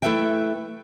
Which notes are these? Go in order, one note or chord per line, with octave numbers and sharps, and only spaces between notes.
A3 E4 A4 B4 E5 G5